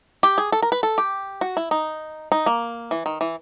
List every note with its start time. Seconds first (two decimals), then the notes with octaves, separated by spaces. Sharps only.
0.23 G4
0.38 G#4
0.52 A4
0.62 A#4
0.72 B4
0.83 A4
0.98 G4
1.41 F#4
1.57 E4
1.71 D#4
2.32 D#4
2.46 A#3
2.91 E3
3.06 D#3
3.21 E3